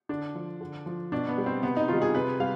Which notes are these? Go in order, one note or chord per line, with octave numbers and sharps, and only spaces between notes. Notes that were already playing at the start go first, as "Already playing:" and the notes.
D3 D4
F3
D3
F3
B2 D4
B3
G3
C4
C3 B3
D#4
D#3 G3 F4
G#4
C3 B4
G3 F5